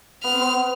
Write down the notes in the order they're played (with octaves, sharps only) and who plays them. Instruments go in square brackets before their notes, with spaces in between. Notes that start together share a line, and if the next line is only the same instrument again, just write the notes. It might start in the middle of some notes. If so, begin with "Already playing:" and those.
[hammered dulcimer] B3 [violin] F6
[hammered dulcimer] C4
B3